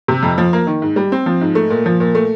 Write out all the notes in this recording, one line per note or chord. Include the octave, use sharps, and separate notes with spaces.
C3
F2
F3
A#3
D#3
G#2
G3
C4
F3
G#2
A3
A#2
F3
A#2
A3